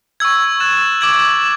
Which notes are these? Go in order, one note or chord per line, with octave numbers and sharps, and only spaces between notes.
C#6 E6 G#6
F#6 A6 E7
D6 G#6 D7 F#7